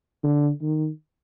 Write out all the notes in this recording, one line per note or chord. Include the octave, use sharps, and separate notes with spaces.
D3
D#3